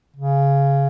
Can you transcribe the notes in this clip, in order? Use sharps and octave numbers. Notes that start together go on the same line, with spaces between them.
C#3